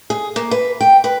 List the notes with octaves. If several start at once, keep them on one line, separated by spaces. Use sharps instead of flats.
G#4
A#3
B4
G5
B4